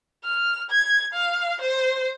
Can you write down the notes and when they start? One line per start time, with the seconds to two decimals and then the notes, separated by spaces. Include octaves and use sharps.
0.24 F6
0.70 G#6
1.14 F5
1.61 C5